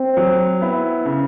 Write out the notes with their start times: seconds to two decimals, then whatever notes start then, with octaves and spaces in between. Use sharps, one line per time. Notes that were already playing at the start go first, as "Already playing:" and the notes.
Already playing: C4
0.17 F#3
0.61 B3 E4
1.05 C#3